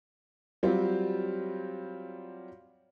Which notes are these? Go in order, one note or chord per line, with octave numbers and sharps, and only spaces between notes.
F#3 G3 C4 F4